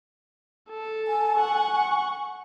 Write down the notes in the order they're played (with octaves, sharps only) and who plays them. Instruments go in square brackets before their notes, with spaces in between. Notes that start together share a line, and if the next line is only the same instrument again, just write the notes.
[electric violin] A4
[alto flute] G#5
[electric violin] F#5 C#6